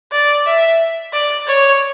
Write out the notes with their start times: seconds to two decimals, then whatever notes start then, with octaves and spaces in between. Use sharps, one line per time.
0.12 D5
0.46 E5
1.13 D5
1.47 C#5